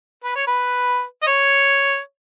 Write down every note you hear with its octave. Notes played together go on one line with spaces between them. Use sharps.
B4
C#5
B4
D#5
C#5